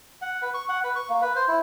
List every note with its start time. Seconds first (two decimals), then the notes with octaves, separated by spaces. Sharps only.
0.22 F#5
0.42 B4
0.54 C#6
0.69 F#5
0.84 B4
0.96 C#6
1.10 A#3
1.22 B4
1.35 C5
1.48 E4